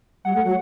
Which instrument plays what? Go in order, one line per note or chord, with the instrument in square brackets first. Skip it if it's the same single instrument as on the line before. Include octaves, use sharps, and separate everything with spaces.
[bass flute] G3 [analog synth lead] F#5
[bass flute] A3
F#3